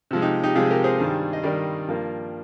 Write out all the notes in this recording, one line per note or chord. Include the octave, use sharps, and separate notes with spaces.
C3 F3 G#3
D#4 G4
D#4 G4
C3 F3 G#3 F4 G#4
G4 A#4
G#4 C5
G2 D#3 G3
D#5
G2 D#3 G3 A#4 D5
G2 F3 A#3